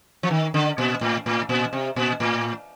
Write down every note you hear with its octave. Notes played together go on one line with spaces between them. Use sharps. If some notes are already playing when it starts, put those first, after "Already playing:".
F3
D#3
D3
A#2
A2
A2
A#2
C3
A#2
A2